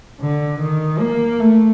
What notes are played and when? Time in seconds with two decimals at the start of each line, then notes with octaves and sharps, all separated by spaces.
0.20 D3
0.60 D#3
1.00 A#3
1.39 A3